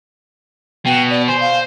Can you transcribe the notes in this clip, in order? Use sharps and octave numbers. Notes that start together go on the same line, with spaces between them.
B2 G5
D5
C5 G#5
F5